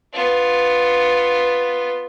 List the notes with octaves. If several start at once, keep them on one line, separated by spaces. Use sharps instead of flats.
B3 F4